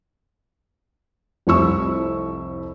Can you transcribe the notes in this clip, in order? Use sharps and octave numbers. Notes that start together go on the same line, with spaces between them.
F1 C2 E4 C#6 E6